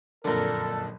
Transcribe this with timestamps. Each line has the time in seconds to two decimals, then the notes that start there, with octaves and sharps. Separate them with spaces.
0.25 F#1 F2 A#2 D3 D4 A4 A#4